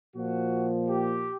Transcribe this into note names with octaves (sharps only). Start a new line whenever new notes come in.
A#2 F3 F#4
G4